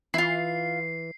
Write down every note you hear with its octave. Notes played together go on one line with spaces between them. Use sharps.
E3 E4 F4 C7